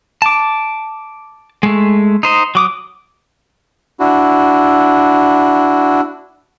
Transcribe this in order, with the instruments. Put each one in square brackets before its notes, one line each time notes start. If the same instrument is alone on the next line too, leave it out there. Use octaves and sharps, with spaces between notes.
[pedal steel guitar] A5 D6
G#3 A3
D#4 C5 D#5
F#3 D6 D#6
[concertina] D4 E4 F#4